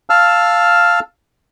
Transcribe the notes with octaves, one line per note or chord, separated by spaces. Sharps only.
F5 A5 E6 F6